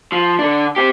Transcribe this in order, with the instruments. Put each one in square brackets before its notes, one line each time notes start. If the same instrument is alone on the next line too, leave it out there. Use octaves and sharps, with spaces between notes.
[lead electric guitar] F3
D3 D4
C4 G4